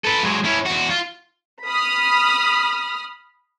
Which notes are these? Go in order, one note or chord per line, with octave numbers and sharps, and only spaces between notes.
A4 B4
F#3 G#3
C#4 E4
E2 F#4
F4
B5 D#6 F6